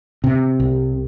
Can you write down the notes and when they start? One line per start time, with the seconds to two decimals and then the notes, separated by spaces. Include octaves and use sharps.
0.24 C3
0.60 C2